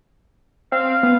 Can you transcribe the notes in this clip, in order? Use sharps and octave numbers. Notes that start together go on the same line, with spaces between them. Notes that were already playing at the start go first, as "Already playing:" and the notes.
C4 F5
B3